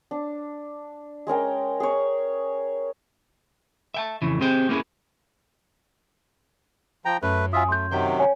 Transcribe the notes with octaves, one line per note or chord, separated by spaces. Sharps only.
D4
G#3 C#4 A#4 G5
G#4 A#4 C#5
E5 G5 A5
F2 C#3 E3
C4 G4 G#4 C5 G5
A#3 B3 C#4 E4 G#4
F3 G5 A#5
F#2 A3 B4
F#3 F4 E5 G#5 D#6
A3 C6 G6
C3 D#3 F#3 C5 G5 B6
C#5 G#5